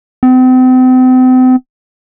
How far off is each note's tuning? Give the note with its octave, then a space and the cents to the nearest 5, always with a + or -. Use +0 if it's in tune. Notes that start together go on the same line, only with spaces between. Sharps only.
C4 -40